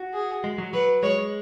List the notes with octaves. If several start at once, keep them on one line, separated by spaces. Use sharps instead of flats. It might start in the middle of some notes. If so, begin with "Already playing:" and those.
Already playing: F#4
G#4
G#3
F#3
F#3 B4
G#3 C#5